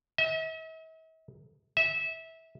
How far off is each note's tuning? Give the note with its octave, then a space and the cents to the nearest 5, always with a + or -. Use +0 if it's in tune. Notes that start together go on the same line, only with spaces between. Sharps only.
E5 -45
E5 -20